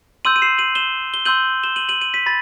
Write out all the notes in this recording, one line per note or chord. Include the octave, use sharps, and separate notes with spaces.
C6 E6 G6 D#7 F#7
D#7
C7 E7
D#7 F#7
E7 G7
G7
C6 E6 G6 D#7 F#7
E7 G7
D#7 F#7
D#7 F#7
D#7 F#7
B6 D#7
B5 A6